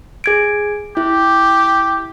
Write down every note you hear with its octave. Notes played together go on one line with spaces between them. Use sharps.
G#4 G#6 D7
E4 G4